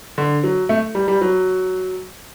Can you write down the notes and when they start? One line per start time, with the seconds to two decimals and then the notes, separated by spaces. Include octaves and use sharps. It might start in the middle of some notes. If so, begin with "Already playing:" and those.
0.18 D3
0.44 F#3
0.69 A3
0.95 G3
1.08 G3
1.21 F#3